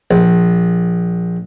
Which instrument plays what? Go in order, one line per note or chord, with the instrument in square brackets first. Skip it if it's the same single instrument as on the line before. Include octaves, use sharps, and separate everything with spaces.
[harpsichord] A#1